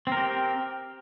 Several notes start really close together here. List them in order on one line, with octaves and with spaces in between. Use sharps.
C4 A#4 G4